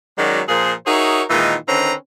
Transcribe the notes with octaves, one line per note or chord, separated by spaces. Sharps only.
D#3 F#3 G#3 C#4 F#4 D5
A#2 F3 G#4 A#4 C5
D#4 F#4 G#4 A#4 C#5 E5
A#2 D#3 E3 G#3 D#4
D3 D#3 C4 C#4 B4 A#5